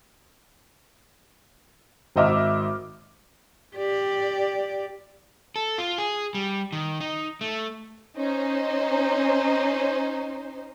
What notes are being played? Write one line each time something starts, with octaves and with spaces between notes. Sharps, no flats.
G#1 C5 D#5 E5 D6 F6
G4 D5
A4
F4
G#4
G3
D#3
D#4
A3
C#4 D#4 C5